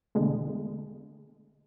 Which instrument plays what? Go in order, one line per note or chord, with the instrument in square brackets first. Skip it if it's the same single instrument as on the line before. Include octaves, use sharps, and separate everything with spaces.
[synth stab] E2 B2 D3 G#3 A3